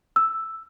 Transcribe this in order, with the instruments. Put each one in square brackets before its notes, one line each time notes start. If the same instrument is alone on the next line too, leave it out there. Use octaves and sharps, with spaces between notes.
[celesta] E6